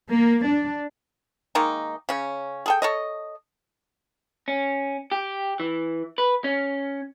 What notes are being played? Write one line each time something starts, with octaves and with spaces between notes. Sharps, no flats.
A#3
D4
D#3 G#3 A#3 D#4
C#3 C#4
G#4 A4 G5
A4 C#5 D#5
C#4
G4
E3
B4
C#4